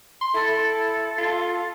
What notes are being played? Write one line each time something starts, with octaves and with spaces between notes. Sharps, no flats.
C6
E4 A4
F4